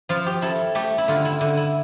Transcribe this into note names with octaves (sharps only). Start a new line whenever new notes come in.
F3 F4
G4
E4 A4
A3 G4
E4
D3 F4
E4
D3
E4